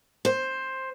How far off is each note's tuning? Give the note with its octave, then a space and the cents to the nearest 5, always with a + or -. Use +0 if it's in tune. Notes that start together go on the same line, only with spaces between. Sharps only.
C5 +10